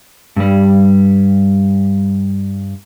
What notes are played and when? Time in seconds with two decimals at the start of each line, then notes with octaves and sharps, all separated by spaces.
0.36 G2 G3